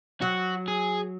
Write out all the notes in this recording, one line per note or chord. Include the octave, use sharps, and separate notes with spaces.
F#3 F#4
G#4